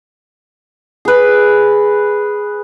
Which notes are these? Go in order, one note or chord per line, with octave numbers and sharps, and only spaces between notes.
G#4 B4